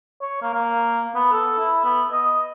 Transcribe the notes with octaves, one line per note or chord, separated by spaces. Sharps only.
C#5
A#3
A#3
B3
A4
E4
B3
D#5